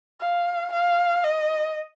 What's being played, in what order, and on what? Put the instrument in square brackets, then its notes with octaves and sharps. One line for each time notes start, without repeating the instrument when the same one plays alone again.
[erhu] F5
F5
D#5